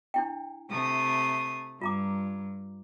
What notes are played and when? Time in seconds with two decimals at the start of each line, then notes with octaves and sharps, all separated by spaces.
0.14 D4 E4 G5
0.71 C3 A3 D#6
1.81 G2 F4 A#5 D6